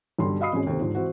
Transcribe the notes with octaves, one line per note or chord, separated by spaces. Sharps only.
B1 G2 D3 G3 C6
F#4 D#5 F5 B5 D#6 C7
G#1 F#2 C#4 G#4
D#2 C3 A4 C5
G#2 D3 F3
E3 C4 F#4